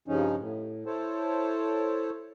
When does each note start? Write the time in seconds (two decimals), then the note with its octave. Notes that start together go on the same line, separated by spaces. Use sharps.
0.08 G2 C#3 F3 C#4 D#4
0.38 A2
0.86 E4 A4 C5 C#5 A5